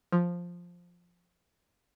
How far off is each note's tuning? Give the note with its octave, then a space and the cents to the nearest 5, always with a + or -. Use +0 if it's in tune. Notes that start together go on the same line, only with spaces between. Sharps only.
F3 +5